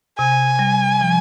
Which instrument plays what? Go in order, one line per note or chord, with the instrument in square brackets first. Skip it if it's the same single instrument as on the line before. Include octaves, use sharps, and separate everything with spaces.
[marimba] C3 [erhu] G#5
[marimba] G3
F3